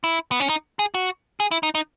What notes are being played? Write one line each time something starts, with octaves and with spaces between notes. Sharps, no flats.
E4
B3
C#4
D#4
G#4
F#4
G#4
E4
D#4
D#4